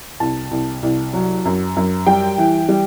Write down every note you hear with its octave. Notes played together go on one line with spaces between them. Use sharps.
C2 A5
C2
C2
F#3
F#2
F#2
G3 G5
E3
G3